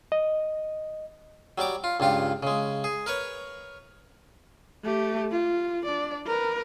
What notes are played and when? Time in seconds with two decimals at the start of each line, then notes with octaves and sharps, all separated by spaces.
0.12 D#5
1.58 F#3 G3 G4 D6
1.84 F4
2.00 C#2 G2 F4 G4
2.43 C#3 G#3
2.84 G#4
3.06 A#4 B4 C#5
4.85 A3 G4
5.31 F4
5.85 D4 D5
6.26 A#4 B4